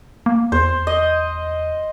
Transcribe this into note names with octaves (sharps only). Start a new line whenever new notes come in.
A#3
E2 C5
D#5